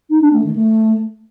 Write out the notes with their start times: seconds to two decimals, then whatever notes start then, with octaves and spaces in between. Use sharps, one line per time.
0.10 D#4
0.21 D4
0.33 A3
0.44 D#3
0.56 A3